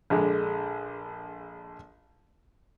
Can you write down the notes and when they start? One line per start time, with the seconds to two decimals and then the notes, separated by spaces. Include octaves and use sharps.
0.10 A#1 D3 G#3 G#4